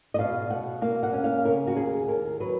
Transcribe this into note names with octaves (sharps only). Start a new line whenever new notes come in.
D#5
B2 F5
B2 F#5
A#3 F5
F#5
C#4
F5
C#3 A#4
F#4
D#2 G#4
D#2 A#4
F#3 B4